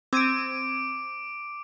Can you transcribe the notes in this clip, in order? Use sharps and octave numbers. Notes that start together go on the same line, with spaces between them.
C4 D6 G#6 D7 D#7